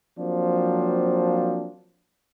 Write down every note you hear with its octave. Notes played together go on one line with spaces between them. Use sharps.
F3 F#3 A#3 C4 D4